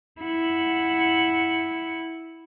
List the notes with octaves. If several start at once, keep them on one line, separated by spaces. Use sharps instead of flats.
E4 F#5